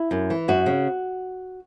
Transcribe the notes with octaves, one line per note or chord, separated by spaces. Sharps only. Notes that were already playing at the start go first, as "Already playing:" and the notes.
Already playing: E4
F#2
E3
F#2 F#4
C#3